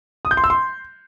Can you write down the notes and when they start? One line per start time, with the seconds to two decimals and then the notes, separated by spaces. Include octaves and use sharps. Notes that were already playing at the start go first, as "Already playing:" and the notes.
0.25 D#6
0.31 G6
0.37 C6
0.44 E6
0.50 C6